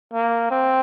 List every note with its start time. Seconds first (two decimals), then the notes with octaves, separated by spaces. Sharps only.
0.13 A#3
0.51 C4